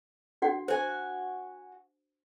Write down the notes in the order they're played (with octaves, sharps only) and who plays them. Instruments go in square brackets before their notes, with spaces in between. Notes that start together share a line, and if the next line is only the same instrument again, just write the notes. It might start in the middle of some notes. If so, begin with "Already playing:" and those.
[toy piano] D4 F#4 F#5
[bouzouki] F#4 G#5 [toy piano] C5